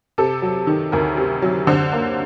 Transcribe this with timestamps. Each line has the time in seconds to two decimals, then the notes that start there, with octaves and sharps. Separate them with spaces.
0.18 C3 A4
0.42 F#3
0.67 D#3
0.92 D2 A#4
1.17 C3
1.42 F#3
1.67 D3 C5
1.92 A#3